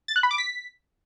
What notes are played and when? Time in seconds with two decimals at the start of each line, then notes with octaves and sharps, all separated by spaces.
0.08 A6
0.16 F#6
0.23 B5
0.31 D6
0.38 B6